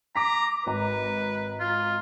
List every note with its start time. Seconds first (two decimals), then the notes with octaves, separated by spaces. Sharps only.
0.16 A#5 D6 B6
0.66 G#1 B4 A#5
1.60 F4